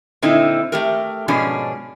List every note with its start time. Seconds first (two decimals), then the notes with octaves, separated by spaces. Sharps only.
0.22 A#2 D3 C4 D#4 E4
0.72 A3 G4 A#4
1.28 G#2 B2 F3 C#4 D4 G#4